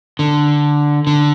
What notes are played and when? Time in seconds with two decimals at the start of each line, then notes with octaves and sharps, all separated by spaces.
0.19 D3
1.07 D3